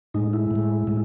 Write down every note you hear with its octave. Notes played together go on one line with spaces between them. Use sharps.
A2 G#3 D#4
E4
A2 G#3
A2 G#3